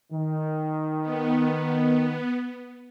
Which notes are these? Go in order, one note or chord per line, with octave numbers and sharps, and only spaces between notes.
D#3
B3